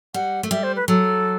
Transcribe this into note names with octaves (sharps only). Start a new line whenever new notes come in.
G3 F#5
A3
G3 E5
C5
B4
F#3 A4